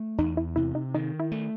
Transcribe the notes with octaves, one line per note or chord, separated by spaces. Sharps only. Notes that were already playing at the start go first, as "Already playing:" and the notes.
Already playing: A3
E2 D#4
E4
C3 E4
D#4
D#3 D#4
E4
A3